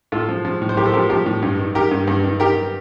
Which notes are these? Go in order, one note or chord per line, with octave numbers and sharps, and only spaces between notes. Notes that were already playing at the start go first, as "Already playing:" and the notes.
A2 F4 A4
F3
F3
A2
C5
A2 G4 A#4
A4 C5
F3 G4 A#4
F3 G4 A#4
A2
G2
D#3
D#3 G4 A#4
G2
G2
D#3
D#3 G4 A#4